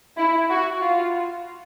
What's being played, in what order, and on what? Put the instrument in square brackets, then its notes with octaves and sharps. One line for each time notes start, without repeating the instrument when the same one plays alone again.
[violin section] E4
F#4
F4